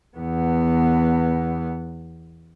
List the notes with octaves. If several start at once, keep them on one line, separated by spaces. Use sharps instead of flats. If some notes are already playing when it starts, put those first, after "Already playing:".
E2 B3